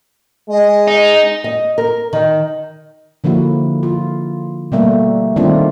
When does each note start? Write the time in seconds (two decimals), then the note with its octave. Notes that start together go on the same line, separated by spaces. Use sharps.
0.49 G#3 D#5
0.88 D#4
1.44 D#5
1.78 A#4
2.13 D#3
3.24 D3 F3 A#3 E4 F#4
3.83 F4
4.72 B2 G3 A3 A#3
5.36 D#3 G3 A3 C4 D4 F4